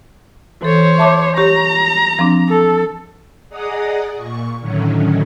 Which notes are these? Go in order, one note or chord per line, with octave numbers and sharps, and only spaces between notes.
E3 A4 C5 C#5
E5 A5 D6
G4 C#5 A#5 C#6
F3 C4 D4
A4
G#4 D5 D#5 F#5 A#5 D#6
A#2 C#6
A2 D3 D#3 F#3 C#4